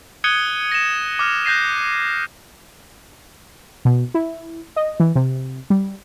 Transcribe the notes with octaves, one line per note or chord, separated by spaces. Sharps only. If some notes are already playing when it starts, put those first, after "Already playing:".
D#6 F#6 G#6 C#7 D#7 G7
A#6 E7
D6 F6
F#6 G6 A#6 C7 D#7
B2
E4
D#5
E3
C3
G3